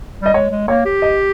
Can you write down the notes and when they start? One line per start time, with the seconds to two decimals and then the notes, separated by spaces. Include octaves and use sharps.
0.21 G3 D#5
0.34 G#3 C#5
0.51 G#3
0.68 A#3 C#5
0.86 G4
1.02 D#5